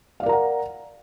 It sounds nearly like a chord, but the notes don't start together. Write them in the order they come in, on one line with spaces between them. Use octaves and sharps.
F5 D5 A#4 A#5 F#5